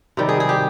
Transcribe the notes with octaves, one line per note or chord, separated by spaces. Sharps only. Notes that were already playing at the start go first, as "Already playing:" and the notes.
C3 D#3 G3
G#4
G#4
G4